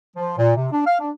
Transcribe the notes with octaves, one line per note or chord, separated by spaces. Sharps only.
F3
A#2
C3
D4
F5
D4